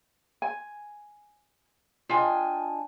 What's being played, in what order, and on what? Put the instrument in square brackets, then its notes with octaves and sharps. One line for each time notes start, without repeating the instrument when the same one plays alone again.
[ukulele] G#5
[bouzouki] D4 G5 G#5 [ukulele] F4 D#5